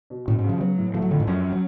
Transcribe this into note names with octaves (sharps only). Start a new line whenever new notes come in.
B2
A2 C#4
G#2
C#3
F3
F#3 B3
A2
F3 A3
F#3
F2 D3
G#2
F#2 C#4
F#3